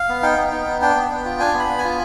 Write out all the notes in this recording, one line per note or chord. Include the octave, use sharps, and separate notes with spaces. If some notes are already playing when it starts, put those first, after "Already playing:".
Already playing: F5
B3
D#4 G5
B3
D#4
B3
D4 G5
B3
B3
F4
D4 G#5
B3
B5
B3
G#5
F4